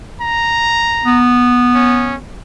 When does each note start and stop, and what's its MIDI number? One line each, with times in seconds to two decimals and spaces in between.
0.21 1.21 82
1.05 2.21 59
1.75 2.15 61